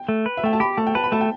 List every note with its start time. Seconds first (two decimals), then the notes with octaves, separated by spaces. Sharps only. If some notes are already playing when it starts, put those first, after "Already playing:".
Already playing: G5
0.09 A3
0.26 B4
0.37 E5
0.44 A3 G5
0.53 A5
0.60 G4 B5
0.77 A3 A5
0.87 G5
0.95 B4 A5
1.04 B5
1.12 A3 A5
1.21 G5